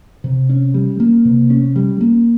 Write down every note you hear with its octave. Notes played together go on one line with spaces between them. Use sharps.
C3
C#4
G3
A#3
C3
C#4
G3
A#3